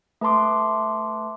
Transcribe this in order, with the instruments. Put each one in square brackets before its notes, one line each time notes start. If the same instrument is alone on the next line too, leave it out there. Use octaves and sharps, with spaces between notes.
[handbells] A3 B4 A5 C6 D6